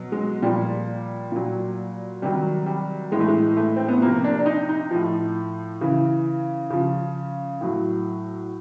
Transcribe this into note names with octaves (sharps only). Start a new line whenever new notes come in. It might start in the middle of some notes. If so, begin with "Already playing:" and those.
Already playing: B2 F#3
G#3
A#2 F3 G3
A#2 F#3
C3 D#3 F#3 G3
G3
A2 E3 G#3
A3
G#3
A3
C4
B3
C3 F3 A#3
D4
D4
D#4
D#4
A2 F3
C#3 E3
C#3 F3
A2 F#3